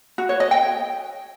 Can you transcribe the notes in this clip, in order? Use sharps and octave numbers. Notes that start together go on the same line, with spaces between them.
F#4
C#5
D#5
G5